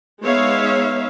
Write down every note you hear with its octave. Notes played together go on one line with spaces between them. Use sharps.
G#3 B3 D#4 C#5 E5 F5